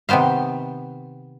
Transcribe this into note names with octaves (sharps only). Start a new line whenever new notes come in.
C3 D#3 B3 C5 F5